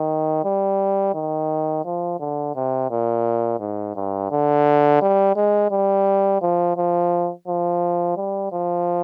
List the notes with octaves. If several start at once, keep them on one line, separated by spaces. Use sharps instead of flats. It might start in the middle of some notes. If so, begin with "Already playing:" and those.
Already playing: D#3
G3
D#3
F3
D3
C3
A#2
G#2
G2
D3
G3
G#3
G3
F3
F3
F3
G3
F3